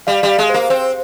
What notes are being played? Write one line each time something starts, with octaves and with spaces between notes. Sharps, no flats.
G3 F5
G3
F5
G#3
A#3 C5
C4 C5